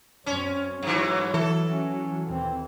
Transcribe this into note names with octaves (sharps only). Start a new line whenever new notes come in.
F#2 C4 C#4 C#5
G2 E3 F#3
E3 A4
C#4
D#2 E3 C4